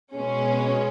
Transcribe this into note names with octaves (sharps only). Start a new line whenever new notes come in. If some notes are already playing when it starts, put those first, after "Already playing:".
B2 G#3 C#4